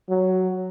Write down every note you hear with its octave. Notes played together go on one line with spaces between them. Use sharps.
F#3